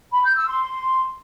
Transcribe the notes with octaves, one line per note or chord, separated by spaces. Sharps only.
B5
G6
E6
C6